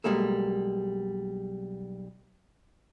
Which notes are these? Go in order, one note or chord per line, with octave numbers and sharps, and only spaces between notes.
B1 G3 G#3 A#3 A4